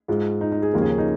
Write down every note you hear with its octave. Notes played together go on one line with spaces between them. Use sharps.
G#2 G#3 F4
D#4
D#4
G#4
D#2 C#3 F3 A#3 F4 A#4
G#4
C#4
D#4